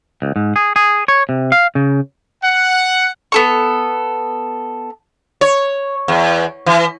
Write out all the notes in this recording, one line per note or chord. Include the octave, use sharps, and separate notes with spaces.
C#2
G#2
G#4
G#4
C#5
C3
F5
C#3
F#5
B3 A4 C#6
C#5
E2
E3